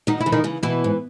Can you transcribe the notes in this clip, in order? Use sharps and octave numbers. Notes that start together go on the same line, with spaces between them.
D#3 F#3 D#4
E4
C#3 E3
D#3 D#4
C#3 E3
B2 E3 E4
G#2